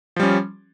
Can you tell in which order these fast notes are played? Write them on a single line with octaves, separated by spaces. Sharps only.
F3 G3 C#4